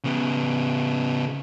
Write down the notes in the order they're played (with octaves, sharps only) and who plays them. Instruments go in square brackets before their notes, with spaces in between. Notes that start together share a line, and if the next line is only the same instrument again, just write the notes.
[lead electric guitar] C#3 B3